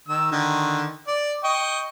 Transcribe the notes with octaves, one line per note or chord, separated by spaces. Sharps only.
D#3 E6
D3 D#3
D5
D#5 G5 C#6